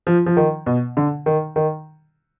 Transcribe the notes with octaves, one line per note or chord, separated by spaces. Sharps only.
F3
F3
D#3
B2
D3
D#3
D#3